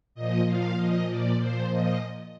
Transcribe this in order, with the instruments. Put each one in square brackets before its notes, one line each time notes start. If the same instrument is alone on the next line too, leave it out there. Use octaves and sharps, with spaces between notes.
[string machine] A#2 F3 D#5
A#2 F3 F5
A#2 F3 D#5
A#2 F3 D5
A#2 F3 C5
A#2 F3 D#5